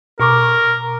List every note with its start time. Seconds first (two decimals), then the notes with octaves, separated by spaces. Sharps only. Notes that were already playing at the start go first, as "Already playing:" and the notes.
0.20 B2 A#4 C#6 D6